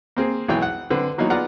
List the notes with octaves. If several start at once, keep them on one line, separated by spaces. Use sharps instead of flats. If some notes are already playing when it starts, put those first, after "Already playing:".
A#3 C4 G#4
B1 E3 G#3 G#4 C#5 G5
F#5
D3 C4 B4
E3 F#3 A#3 B3 D#4 F#4
B3 F4 G#4 D5 F#5 A#5